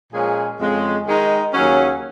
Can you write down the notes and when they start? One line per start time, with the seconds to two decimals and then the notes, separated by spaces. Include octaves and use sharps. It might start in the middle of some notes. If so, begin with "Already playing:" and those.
0.12 A#2 F3 G#3 C#4 G#4
0.60 F2 C#3 G#3
1.06 D#3 G#3 D#4
1.53 D#2 C#3 F#3 C#4